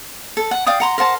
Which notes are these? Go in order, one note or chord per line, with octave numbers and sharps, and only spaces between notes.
A4
F#5
D5 F5 G5 D#6
F#5 A#5 C6
A#4 C5 F#5 A5